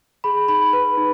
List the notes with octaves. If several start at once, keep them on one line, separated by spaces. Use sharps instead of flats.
G#4 B5
D#4 B5
B4
D#4